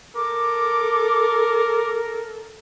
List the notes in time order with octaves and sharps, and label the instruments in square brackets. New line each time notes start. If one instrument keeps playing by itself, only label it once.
[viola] A4 [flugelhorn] A#4 [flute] D6